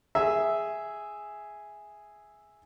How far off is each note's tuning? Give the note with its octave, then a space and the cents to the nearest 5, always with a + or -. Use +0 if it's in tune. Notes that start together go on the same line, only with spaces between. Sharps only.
G#4 +0 E5 +0